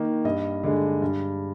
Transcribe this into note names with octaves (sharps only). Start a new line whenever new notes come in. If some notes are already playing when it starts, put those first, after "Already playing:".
Already playing: D#3 A#3 D#4
G2 D#5
D3 G#3
G2